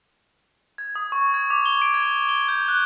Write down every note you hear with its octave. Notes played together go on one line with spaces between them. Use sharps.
G#6
D#6
C#6
G#6
D6
G7
D7
G#6
G7
G6
F#6